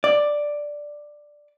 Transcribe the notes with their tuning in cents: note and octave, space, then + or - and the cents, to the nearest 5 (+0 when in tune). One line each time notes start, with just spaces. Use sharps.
D5 +5